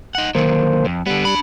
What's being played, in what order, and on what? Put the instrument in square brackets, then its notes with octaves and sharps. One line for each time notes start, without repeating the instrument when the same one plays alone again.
[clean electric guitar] D#4 F#5
[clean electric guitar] D3 D#3 F#3 [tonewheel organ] A#3 C5
[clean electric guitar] F2
[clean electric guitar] D3 B3 [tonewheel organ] G3 F#6
[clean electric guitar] D4 B5